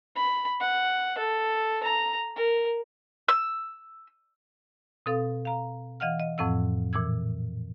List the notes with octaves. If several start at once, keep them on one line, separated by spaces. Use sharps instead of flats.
B5
F#5
A4
A#5
A#4
E6
B2 C4 A4 F5 D#6
F5 A#5
E3 D#5 F5 F#5 F6
D#5
F2 A2 F3 C4 F#5 E6
A#2 E3 D6 E6 G#6